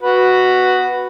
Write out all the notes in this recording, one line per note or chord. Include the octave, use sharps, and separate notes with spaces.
F#4 B4